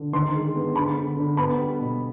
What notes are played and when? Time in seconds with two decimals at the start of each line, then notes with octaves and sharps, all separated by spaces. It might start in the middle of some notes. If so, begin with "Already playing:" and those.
Already playing: D3
0.13 D#3 C6
0.34 G#3
0.55 B3
0.76 D3 B5
0.97 D3
1.17 D3
1.37 B3 B5
1.58 G3
1.79 B2